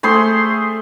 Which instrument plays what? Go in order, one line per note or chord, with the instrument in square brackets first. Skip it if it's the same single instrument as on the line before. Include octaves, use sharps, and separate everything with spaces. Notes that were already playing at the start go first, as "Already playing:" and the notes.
[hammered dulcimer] A3 G#4 C5 C6